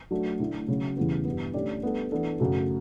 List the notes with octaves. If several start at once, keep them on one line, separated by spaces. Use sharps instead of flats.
F#3 A3 D4 F#4
D3 A3 E4
C#3 F#3 C#4 F#4
E2 C#3 E3 G3 B3
G2 E3 B3
D3 A3 C#4 G4 D5
G3 B3 D4 A4
E3 B3 D4 A4
F#2 C#3 F#3 A3